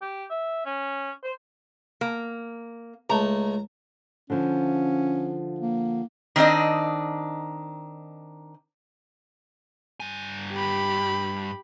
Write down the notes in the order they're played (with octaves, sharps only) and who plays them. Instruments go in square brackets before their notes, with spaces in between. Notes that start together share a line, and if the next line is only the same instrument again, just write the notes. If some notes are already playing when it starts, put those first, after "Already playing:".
[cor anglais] G4
E5
C#4
C5
[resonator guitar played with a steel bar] A#3
[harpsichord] C#2 A3 [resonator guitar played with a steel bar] A#5
[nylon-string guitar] D3 F3 [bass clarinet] C#4
[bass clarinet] A#3
[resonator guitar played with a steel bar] D#3 C4 D4 D#5
[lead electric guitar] G2 G#5
[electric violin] G4 B5